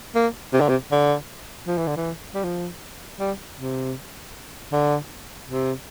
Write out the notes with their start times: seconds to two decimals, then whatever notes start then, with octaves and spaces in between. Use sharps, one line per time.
0.15 A#3
0.53 C3
0.61 D3
0.69 C3
0.92 D3
1.67 F3
1.78 E3
1.87 D3
1.97 E3
2.35 G3
2.44 F3
3.20 G3
3.58 C3
4.72 D3
5.49 C3